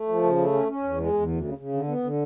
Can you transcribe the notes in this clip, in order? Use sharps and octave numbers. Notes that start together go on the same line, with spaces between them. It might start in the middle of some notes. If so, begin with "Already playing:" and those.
Already playing: A3
F3
C#3
A3
C#4
C#4
E2
G#3
E2
D2
C#3
C#3
D3
B3
D3